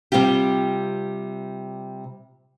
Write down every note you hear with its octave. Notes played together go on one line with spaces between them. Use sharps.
C3 G3 C4 F4 G4